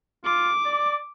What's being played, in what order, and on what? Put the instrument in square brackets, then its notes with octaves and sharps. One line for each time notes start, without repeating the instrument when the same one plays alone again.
[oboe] F4 [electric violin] D6
[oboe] D5